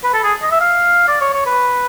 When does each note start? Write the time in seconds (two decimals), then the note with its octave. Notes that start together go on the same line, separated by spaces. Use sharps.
0.04 B4
0.14 A4
0.24 G#4
0.42 D#5
0.51 E5
0.61 F5
1.08 D5
1.21 C#5
1.34 C#5
1.46 B4